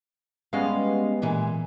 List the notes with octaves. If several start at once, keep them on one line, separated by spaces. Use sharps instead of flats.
G3 G#3 B3 C#4 F5
A#2 E3 G#3